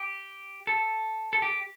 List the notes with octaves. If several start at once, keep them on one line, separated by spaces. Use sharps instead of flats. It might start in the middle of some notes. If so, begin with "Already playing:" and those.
Already playing: G4
A4
A4
G4